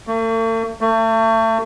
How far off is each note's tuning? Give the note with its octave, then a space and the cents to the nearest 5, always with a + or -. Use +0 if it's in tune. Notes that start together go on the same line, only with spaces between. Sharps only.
A3 +45
A3 +35